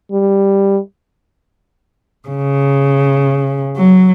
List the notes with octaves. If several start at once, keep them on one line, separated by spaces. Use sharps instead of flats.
G3
C#3
F#3